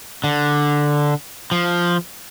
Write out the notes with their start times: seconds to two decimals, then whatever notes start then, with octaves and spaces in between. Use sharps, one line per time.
0.24 D3
1.51 F3